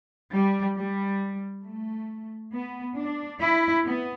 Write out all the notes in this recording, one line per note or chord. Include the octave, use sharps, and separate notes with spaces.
G3
G3
A3
B3
D4
E4
B3